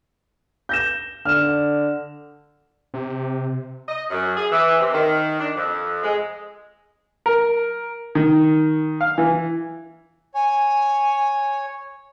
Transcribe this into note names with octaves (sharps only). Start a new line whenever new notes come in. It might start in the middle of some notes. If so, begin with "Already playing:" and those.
G6 A#6 E7
D3 F6 E7
C3
D#5
F#2
G#4
E3
C3
D#3
D4
F2
G#3
A#4
D#3
F5
E3
C#5 G#5